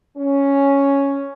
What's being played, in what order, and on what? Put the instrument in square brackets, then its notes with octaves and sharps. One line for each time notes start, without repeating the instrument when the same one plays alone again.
[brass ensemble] C#4